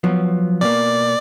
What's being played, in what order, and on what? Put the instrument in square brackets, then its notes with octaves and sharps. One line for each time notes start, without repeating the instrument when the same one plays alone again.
[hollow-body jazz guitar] F3 F#3 B3
[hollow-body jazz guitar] B2 A#3 [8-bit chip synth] D5